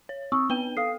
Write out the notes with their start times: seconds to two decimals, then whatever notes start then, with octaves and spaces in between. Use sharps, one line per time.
0.09 C#5
0.32 C4 C#6 D#6 E6
0.50 B3 B4 G5 G7
0.77 A4 F5 D#6 C7